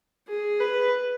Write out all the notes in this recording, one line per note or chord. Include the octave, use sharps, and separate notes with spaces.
G#4
B4